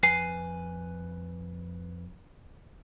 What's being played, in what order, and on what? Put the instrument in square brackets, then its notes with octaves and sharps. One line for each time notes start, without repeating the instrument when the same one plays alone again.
[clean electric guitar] F2 B4 G#5 [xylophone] C7